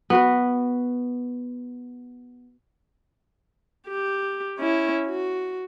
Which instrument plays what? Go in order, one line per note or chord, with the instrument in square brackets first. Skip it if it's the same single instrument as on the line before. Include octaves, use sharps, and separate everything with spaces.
[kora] B3 F#4 B4
[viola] G4
C#4 E4
F#4